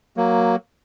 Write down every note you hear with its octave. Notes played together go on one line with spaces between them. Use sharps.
F#3 A#3